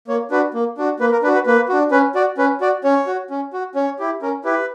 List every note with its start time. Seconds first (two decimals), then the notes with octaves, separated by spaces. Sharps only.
0.08 A#3 C#5
0.31 D4 F#4 B4
0.54 A#3
0.78 D4 F#4
1.00 A#3 B4
1.12 A#4
1.23 D4 B4
1.27 F#4
1.34 B4
1.47 A#3 B4
1.69 D4 F#4
1.92 C#4 B4
2.15 F#4 D5
2.38 C#4 B4
2.61 F#4 D5
2.84 C#4 C#5
3.07 F#4
3.30 C#4
3.53 F#4
3.75 C#4 C#5
3.99 E4 G4
4.22 C#4 A#4
4.44 E4 G4 B4